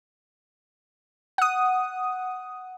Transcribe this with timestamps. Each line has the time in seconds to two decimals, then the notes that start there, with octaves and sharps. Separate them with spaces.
1.38 F#5 D#6